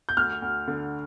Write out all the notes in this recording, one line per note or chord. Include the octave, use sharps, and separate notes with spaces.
G6
D2 F6
D2
D3